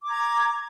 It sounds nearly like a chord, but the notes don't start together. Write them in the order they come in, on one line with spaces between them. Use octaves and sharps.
D6 A#5 G#6